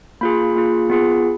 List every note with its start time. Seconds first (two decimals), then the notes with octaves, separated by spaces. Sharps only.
0.21 A#3 F4 G#4 B5
0.55 A#3 F4 G#4
0.90 B3 F4 G#4